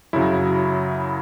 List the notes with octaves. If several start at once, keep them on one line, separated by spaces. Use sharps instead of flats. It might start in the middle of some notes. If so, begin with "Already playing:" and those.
F#2 C#3 F#3 E4